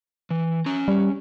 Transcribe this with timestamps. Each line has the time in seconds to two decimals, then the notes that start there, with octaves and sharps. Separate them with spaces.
0.31 E3
0.66 C#4 A#5
0.88 G3